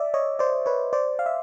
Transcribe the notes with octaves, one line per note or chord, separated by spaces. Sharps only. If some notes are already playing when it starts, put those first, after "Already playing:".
Already playing: D5 E5
C#5 D#5
C5 D5
B4 C#5
C5 D5
F5
E5